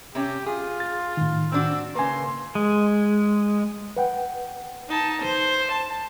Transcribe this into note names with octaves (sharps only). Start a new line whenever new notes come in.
C3 C#4 G4
F4 G#4
A6
A2 D#3
C4 D4 F#4 E6
C#3 A#3 B4 G#5 C6
G#3
B4 F#5 G5
D#4 A5
C5
A5